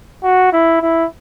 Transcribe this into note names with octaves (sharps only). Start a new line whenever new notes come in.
F#4
E4
E4